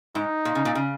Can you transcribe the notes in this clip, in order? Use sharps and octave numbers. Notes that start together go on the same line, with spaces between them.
G#2 D#4
A#2
C#3
A#2
C#3